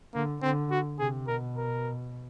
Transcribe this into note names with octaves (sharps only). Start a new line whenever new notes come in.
D3 A#3
D3 C4
F#4
C3 G#4
B2 A#4
A#4